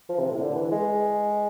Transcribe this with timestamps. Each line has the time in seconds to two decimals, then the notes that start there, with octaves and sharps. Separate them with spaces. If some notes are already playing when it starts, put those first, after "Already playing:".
0.09 F3
0.19 C3
0.29 A2
0.40 D3
0.55 E3
0.71 G#3